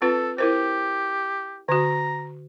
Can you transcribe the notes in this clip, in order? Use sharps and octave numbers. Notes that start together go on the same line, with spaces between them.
C4 F4 A4 B4
E4 G4 A#4 C5
D3 F#4 A#5